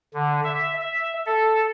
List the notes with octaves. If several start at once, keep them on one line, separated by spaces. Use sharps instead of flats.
D3
E5
E5
A4